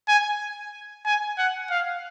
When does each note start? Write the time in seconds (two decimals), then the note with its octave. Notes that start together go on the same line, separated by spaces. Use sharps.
0.08 G#5
1.05 G#5
1.38 F#5
1.70 F5